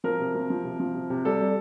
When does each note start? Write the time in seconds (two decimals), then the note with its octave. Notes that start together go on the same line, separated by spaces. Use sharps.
0.04 F3 A#4
0.19 C3
0.35 F3
0.50 F3
0.65 C3
0.80 F3
0.94 C3
1.10 C3
1.25 G3 A4
1.40 G3